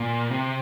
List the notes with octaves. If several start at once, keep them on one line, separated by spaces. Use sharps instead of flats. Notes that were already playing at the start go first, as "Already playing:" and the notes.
Already playing: A#2
C3